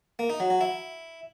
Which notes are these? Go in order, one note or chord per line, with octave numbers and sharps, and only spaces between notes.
A#3
D#4
F#3
F#3
E4